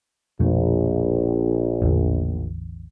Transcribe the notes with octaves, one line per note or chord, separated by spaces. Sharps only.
A#1 F2 B2 A3
A1 E2 D3